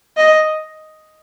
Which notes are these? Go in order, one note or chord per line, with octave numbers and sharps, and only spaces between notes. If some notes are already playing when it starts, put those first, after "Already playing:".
D#5